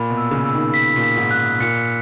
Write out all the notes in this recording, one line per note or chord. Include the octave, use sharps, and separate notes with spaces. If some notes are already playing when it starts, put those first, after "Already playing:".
Already playing: A#2 B5
B2
E6
C#3
E6
D#3
B6
A#2
B6
G#2
F#6
A#2 C#7